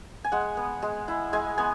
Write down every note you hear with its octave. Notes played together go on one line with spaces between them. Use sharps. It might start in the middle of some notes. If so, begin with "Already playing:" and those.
G#5
G#3 F#5
B3
G#3
E4
G#3 G#5
B3 G#5